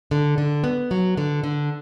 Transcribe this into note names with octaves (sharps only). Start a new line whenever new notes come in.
D3
D3
B3
F#3
D3
D3